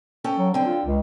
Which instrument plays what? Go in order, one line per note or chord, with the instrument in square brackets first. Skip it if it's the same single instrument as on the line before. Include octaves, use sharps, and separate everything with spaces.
[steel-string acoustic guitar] C#4 A4 G5
[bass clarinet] F#3
[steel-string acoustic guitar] D3 G5 [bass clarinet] C4
[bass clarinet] F4
C#2